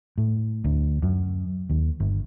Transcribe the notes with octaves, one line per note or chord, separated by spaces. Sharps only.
A2
D2
F#2
D#2
G1